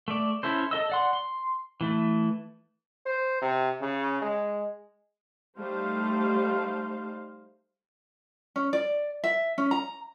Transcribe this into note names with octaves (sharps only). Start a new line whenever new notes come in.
A3 D5
C#4 E4 A4 C5
A4 D#5 E6
D5 F#5 C6
C6
E3 A3
C5
C3
C#3
G#3
G3 A3 D#4 C5 F5
C#4
D5
E5
C#4
A#5